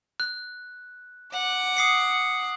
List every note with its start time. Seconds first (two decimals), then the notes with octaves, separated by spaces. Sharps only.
0.20 F#6
1.34 F#5 D6
1.77 D#6 C7 C#7